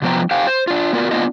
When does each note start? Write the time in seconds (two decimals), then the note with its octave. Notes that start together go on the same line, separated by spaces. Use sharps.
0.02 C3 F3 B3 B4 G5 A#5
0.31 G4 C5 F5 G5 G#5
0.47 C5
0.67 D4 F4
0.93 A#3 B3 F4 F#4 A#4 D5
1.11 A#3 B3 D4 F4 D#5